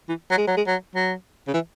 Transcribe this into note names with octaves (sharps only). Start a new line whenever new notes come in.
E3
F#3
G#3
F#3
G#3
F#3
F#3
C#3
E3